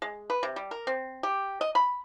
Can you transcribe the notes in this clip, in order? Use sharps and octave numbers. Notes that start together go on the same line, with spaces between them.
G#3
B4
C3
G3
A#4
C4
G4
D#5
B5